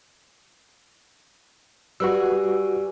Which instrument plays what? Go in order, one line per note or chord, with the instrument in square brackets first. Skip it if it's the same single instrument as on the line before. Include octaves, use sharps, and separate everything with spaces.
[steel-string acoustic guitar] G3 G#4 [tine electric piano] F#4 B4 E6